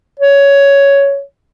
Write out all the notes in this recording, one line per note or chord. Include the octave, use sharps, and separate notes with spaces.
C#5